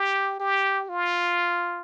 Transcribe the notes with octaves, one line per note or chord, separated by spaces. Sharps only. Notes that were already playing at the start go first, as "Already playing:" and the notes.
Already playing: G4
G4
F4